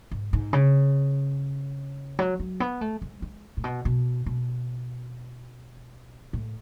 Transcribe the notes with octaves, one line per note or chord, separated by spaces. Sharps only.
G#2
G#2
C#3
F#3
F#3
B3
A3
G#3
G#3
A2
B2
B2
B2
A2